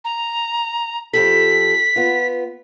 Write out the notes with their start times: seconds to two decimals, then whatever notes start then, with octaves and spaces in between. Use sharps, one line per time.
0.04 A#5
1.13 F2 G4 A4 B6
1.96 B3 F4